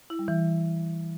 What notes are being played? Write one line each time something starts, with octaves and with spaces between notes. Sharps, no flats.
E4
G3
E3